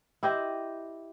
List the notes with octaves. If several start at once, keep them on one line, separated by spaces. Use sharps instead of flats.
E4 G4 C5 D#5